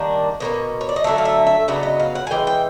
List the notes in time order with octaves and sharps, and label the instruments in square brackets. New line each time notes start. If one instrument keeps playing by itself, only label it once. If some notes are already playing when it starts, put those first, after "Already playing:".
Already playing: [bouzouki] D#3 G3 A#3 D4
B2 F#3 A#3 C#4
C#5
D5
D#5
D3 F#3 A3 E5
F5
E5
E5
C#3 F#3 B3 D4
D#5
F5
F#5
G#5
E3 G#3 G5
G5